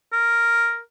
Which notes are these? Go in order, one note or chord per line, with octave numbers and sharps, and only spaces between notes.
A#4